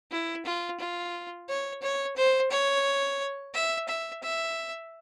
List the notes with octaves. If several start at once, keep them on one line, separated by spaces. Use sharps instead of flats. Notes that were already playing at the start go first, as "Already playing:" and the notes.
E4
F4
F4
C#5
C#5
C5
C#5
E5
E5
E5